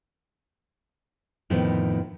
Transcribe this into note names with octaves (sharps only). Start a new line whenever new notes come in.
F2 A2 D3 D#3 F3 B3